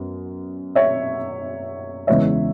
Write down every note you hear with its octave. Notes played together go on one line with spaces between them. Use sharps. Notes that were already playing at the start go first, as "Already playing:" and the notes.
Already playing: F#2 B3
C#5 E5
E2 C#3 G#3 B3 C#5 E5